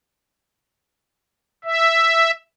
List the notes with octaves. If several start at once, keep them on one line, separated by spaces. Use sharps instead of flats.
E5